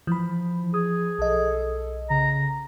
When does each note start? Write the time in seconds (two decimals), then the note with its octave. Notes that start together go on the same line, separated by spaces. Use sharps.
0.07 E3 F3 B5
0.74 G#4 D#6
1.19 B1 A4 D#5
2.10 C#3 A#5